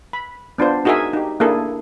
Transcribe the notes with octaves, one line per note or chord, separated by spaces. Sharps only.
B5
B3 D4 F4 C5
D#4 F#4 G#4 A#4 E5 G#5
D#4 G4
A#3 D4 E4 G#4 A4